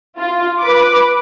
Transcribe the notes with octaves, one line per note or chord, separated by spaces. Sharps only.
F4
B4 D6